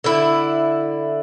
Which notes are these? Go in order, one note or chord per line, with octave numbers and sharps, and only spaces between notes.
D3 E4